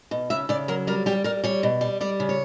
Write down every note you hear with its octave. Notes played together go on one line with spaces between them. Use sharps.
B2
C#3 E5
C#3 D5
F#3 A#4
G3 A#4
G3 G4
G3 A#4
G3 C#5
B2
G3
G3 D5
C#3
C#5